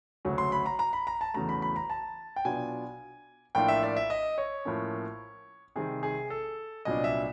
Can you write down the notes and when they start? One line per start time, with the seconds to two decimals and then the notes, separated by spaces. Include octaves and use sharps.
0.25 D2 C#3 F#3 A3 C#4
0.38 C6
0.52 B5
0.66 A#5
0.79 A#5
0.93 B5
1.07 A#5
1.21 A5
1.34 E2 C#3 F#3 A3 A#5
1.49 B5
1.62 B5
1.76 A#5
1.90 A5
2.36 G5
2.45 B2 F#3 B3 D4 F4 G#5
3.55 A2 F3 A#3 D4 F4 G5
3.68 E5
3.83 D5
3.97 E5
4.10 D#5
4.38 C#5
4.65 A2 F3 A#3 C#4
5.76 C3 D#3 G3 C4 G#4
6.03 G#4
6.30 A4
6.85 C2 A#2 F#3 B3 D4 D#5
7.04 E5